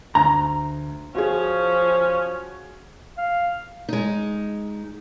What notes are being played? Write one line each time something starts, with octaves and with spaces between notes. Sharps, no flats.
D2 A#5
F3 C#4 F#4 G#4
F5
G#3 D#4